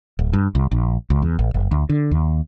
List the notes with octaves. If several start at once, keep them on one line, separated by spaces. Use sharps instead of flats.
D1
G2
C2
A#1
C#2
E2
A1
F#1
D2
D3
D#2